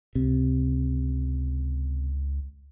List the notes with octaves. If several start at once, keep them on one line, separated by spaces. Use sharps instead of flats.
C#2 C3